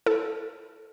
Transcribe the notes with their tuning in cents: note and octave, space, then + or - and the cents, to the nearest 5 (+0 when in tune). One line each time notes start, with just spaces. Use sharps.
E4 +5 A4 +0